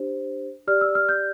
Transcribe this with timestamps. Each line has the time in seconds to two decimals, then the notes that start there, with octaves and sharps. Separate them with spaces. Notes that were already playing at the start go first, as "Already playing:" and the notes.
Already playing: D4 G4 C5
0.68 G4 D5 F6
0.81 E6
0.95 F6
1.09 G6